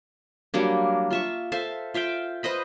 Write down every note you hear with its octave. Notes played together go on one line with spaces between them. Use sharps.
F#3 G3 A#3 D4
F4 E5 C#6
A4 C5 E5 F5
F4 E5 F5 G5
B4 C5 D#5 B5